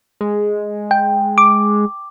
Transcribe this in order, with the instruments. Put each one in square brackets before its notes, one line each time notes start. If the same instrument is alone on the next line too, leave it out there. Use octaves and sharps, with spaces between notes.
[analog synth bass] G#3
[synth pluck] G5
D6